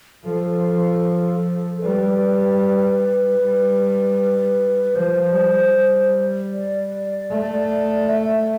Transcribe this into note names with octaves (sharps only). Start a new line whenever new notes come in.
F3 A4
G3 B4
G3
F3 C5
G3
D5
A3
E5